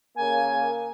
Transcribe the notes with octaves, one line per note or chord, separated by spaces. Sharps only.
C#3 A#3 G#5